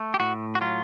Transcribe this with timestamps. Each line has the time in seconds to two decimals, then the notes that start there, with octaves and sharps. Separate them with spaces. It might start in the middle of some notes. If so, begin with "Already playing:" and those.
Already playing: A3
0.14 G4
0.20 A2 F#4
0.55 F#4
0.61 F#3 F4